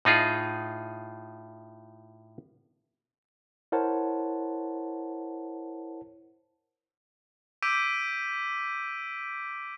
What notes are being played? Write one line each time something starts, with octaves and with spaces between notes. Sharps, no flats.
A2 D#4 F4 G#4
E4 A#4 C5 C#5 F#5 A5
D6 E6 G6 B6 D7 D#7